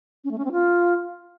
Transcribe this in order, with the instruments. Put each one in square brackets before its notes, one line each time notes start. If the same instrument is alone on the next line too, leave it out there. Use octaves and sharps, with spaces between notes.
[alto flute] C#4
A3
C#4
C4
F4